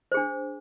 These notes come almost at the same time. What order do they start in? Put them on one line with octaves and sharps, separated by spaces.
C5 G#4 D4